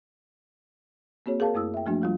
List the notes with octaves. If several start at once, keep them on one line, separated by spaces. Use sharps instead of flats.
A#3 C4 F#4 G#4 C#5
G#4 A#4 F5 A5
F#2 A3 E4 D#6 E6
E5 G5
F3 F#3 A3 A#3 D4 F#4
F3 G3 F4